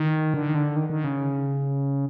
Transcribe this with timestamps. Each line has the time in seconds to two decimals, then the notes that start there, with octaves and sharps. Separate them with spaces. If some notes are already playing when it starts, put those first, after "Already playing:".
Already playing: D#3
0.34 D3
0.49 D#3
0.55 D3
0.76 D#3
0.90 D#3
1.04 C#3